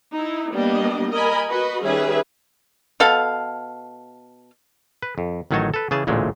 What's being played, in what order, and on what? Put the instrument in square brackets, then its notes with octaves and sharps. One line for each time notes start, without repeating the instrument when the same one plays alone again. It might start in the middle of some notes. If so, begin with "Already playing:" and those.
[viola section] D#4 E4
G3 A#3 B3 D4 D#5
A#4 D#5 G#5 B5
F#4 B4 D#5
D#3 G3 C#4 G#4 B4 E5
[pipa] B2 A4 F5
[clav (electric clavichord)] B4
F2
A1 D#3 F#3 D#4 C#5 A5
A4 B4
C#3 E3 G#4 A5
A1 D2 A#2 G#3 A3